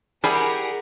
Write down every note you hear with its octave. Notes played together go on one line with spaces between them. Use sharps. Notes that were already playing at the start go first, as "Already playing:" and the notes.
G3 E4 G4 G#4 A#4 F#5